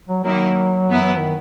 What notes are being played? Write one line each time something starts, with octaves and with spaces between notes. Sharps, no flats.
F#3
D#3 F#3 A#3 E4
F#2 E3 B3 E4
D#3